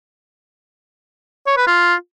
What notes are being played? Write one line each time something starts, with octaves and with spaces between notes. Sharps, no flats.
C#5
B4
F4